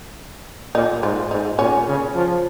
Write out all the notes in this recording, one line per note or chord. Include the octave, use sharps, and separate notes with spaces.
A#2 D#4
G#2 F4
G#2 D#4
A#2 C#4
C#3
F3